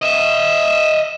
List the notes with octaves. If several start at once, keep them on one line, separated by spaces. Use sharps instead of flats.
D#5 E5